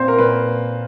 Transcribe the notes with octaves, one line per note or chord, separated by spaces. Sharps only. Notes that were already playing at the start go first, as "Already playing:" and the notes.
Already playing: A#2 C4 C5
A#4
A#2 B4